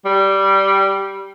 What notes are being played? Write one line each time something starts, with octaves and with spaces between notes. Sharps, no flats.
G3